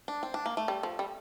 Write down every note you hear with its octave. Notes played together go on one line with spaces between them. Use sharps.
D4
C4
D4
A#3
A3
G3
F3
G3